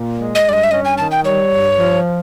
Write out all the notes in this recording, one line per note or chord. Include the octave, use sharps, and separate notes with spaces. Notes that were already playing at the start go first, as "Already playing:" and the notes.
Already playing: A#2
G#3
D#5
G2 D5
D#5
E5
C#4 D#5
G#5
D#3 A5
G5
G3 C#5
G2
F3